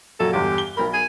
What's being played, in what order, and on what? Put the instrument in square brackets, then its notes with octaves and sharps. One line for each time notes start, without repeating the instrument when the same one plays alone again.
[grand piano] F#2 A#2 F#3 [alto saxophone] A4
[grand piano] G1 E2 [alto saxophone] G4
[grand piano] G7
[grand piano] B1 B5 [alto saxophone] A#4
[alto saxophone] G#5